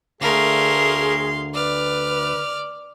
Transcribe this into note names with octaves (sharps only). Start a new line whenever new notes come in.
D2 A3 G#4 A#4 F5 C6
B4 D5 F6